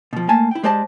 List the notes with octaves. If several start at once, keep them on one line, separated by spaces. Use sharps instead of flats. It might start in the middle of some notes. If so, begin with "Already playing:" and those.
B2 F3
A3 A#3 G#5 A5
E4 G5
G#3 G4 C5 D5 D#5 A5